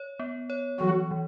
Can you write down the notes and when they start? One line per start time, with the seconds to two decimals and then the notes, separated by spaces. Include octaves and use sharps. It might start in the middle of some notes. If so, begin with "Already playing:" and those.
Already playing: C#5
0.19 B3
0.50 C#5
0.80 E3 F#3 F#4
1.11 E3